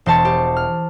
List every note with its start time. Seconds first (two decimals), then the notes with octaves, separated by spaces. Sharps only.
0.06 E1 C5 A5 C#6
0.25 G4
0.56 F6